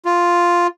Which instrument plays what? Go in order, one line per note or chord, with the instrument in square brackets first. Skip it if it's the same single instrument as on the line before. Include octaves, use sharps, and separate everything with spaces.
[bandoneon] F4